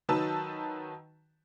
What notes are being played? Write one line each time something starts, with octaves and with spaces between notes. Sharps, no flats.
D#3 F#3 D#4 B4 A5 E6